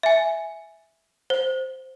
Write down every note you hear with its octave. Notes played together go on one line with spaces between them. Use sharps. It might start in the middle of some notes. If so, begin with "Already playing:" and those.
E5 G#5
C5